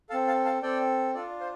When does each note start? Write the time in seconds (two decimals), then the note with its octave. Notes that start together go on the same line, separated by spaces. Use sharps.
0.10 A4 F5 A5
0.13 C4
0.27 F5 A5
0.45 F5 A5
0.62 C4 A4 D5 G5
1.14 D4 F4 A4 D5
1.40 C5 F5